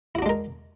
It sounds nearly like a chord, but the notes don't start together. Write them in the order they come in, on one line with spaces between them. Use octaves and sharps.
E4 F#4 D4 G#3 A#4